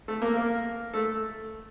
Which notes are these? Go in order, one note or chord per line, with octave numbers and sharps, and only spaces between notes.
A3 A4
A#3 A#4
A#3 A#4
A3 A4